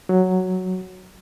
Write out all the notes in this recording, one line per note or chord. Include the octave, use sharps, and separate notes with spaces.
F#3